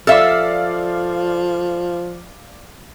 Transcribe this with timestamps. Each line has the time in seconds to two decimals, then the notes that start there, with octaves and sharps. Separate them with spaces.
0.07 F3 A4 D5 E5 F5 F6